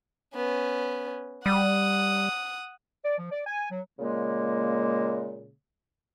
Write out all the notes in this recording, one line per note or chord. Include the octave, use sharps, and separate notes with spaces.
B3 C#4
G3 F#5 D#6
D5
F3
D5
G#5
F#3
A#2 C#3 G#3 A#3